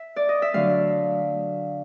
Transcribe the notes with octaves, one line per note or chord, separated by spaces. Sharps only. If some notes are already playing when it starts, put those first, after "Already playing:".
Already playing: E5
D5
D#5
E5
D3 F#3 A3 F5